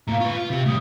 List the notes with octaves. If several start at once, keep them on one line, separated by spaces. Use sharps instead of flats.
A2 A#3 F5 A#5
F4 B4 C#6
F4
C3 G4
A2 D#3 G3 D#6